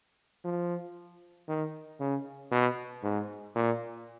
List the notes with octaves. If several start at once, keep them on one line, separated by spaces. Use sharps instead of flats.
F3
D#3
C#3
B2
G#2
A#2